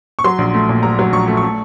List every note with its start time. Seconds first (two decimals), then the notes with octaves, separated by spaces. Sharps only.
0.19 C#6
0.24 F#3 C6
0.38 A#1
0.54 A3
0.69 A#2
0.83 F#3 A#5
0.99 F#3
1.12 A#1 C#6
1.27 A3
1.37 C#6
1.43 A3